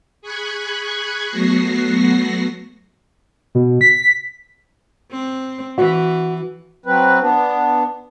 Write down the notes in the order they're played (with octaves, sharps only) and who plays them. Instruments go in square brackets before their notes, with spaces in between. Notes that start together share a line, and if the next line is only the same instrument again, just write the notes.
[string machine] G#4 B5 C#6 F#6 G#6
F#3 A3 B3 F#4 A#6 C7
[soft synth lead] B2
B6
[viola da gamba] C4
[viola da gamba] E3 [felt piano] F#4
[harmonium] F#3 C4 B4
B3 D4